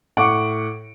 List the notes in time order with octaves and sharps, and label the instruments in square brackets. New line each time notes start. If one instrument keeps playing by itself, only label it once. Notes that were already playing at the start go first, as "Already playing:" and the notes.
[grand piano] A2 F#5 C#6 D6 D7